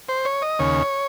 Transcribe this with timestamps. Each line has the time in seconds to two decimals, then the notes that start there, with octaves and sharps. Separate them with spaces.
0.09 C5
0.25 C#5
0.42 D#5
0.59 D#2 C#3 C#5